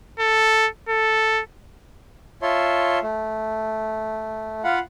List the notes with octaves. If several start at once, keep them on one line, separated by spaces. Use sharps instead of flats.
A4
A4
F4 C#5 E5 A5 C6
A3
F4 F5 F#5 B5